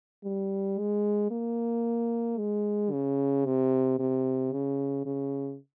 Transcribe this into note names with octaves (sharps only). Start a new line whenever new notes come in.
G3
G#3
A#3
G#3
C#3
C3
C3
C#3
C#3